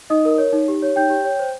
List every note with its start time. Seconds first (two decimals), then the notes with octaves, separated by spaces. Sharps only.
0.10 D#4 D#5 D#6
0.25 A#4
0.38 C#5
0.53 D#4
0.68 G4
0.83 C#5
0.96 D#4 G5 G6
1.10 G4
1.25 C#5
1.39 C5